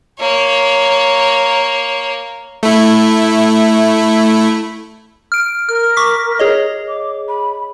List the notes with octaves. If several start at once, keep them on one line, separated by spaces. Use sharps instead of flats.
A#3 C#5
A3 E4
F6 D7
A#4 F6
C#6 D6 B6
G#4 C#5 D#5
D6
B5